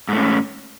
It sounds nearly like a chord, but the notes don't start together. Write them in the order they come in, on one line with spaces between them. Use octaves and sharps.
G#2 A3 C#4